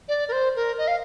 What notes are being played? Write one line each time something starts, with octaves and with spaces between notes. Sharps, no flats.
D5
A#4
C5
A#4
D#5
F5